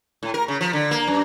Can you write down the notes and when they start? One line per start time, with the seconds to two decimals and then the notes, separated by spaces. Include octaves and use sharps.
0.23 A2
0.34 A#4
0.48 C#3
0.61 F3
0.73 D3
0.91 A#3
1.07 F#2